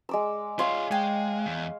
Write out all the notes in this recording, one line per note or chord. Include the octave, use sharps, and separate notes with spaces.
G#3 D6 E6
F4 C#5 E5 F5 C6
G#3 G5 G#5
E2